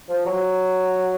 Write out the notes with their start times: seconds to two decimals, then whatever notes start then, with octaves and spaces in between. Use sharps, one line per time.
0.09 F3
0.26 F#3